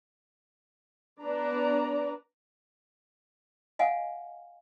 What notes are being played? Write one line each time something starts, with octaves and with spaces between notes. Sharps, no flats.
B3 D4 B4 D5 A#5
D#5 F5 F#5 G#5